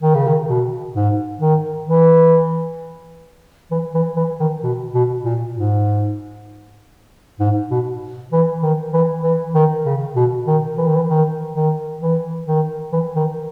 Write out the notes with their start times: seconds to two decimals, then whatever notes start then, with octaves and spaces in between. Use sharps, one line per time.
0.02 D#3
0.15 C#3
0.27 D#3
0.48 B2
0.95 G#2
1.40 D#3
1.86 E3
3.71 E3
3.94 E3
4.16 E3
4.40 D#3
4.63 B2
4.94 B2
5.25 A#2
5.55 G#2
7.40 G#2
7.71 B2
8.33 E3
8.63 D#3
8.93 E3
9.24 E3
9.55 D#3
9.86 C#3
10.16 B2
10.47 D#3
10.77 E3
10.87 D#3
10.96 E3
11.09 D#3
11.55 D#3
12.01 E3
12.47 D#3
12.92 E3
13.16 D#3